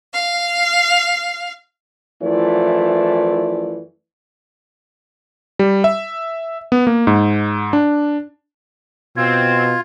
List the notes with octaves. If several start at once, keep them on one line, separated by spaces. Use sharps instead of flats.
F5
F#2 E3 F3 A3 E4 D5
G3
E5
B3
A#3
G#2
D4
B2 C4 F4 G#6